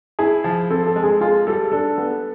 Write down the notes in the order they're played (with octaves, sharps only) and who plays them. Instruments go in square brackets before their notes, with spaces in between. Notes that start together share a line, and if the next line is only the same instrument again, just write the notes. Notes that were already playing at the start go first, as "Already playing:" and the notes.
[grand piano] E4 [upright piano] G#4
[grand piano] F3
[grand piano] C4 [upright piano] A4
[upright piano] A4
[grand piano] G#3
[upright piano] G#4
[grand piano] F4 [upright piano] G#4
[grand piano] G3 [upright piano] A4
[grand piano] D4 [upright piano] A4
[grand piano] B3